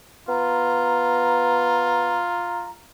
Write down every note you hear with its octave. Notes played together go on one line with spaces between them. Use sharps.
B3 F4 A#5